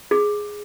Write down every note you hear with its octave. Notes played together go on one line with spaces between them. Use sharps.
G#4